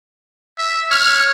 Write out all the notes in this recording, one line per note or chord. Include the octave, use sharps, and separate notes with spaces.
E5
C#5 F6